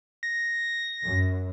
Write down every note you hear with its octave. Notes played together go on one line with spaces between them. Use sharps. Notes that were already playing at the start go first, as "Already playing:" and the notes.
A#6
F#2